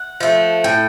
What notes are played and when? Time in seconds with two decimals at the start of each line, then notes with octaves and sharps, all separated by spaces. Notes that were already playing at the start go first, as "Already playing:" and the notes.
Already playing: F#5
0.20 F3 A3
0.64 A2 G5